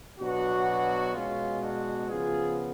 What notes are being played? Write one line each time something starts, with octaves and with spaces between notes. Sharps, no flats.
B2 F#3 B3 D4 F#4
B2 G#3 B3 C#4 F4
D4 F#4
C#3 F3 B3 F4 G#4